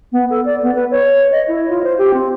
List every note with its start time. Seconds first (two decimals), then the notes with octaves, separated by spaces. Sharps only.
0.12 B3
0.30 A4
0.45 D5
0.63 B3
0.75 B4
0.91 C#5
1.32 D#5
1.48 E4
1.69 F4
1.83 C5
1.98 G4
2.14 C4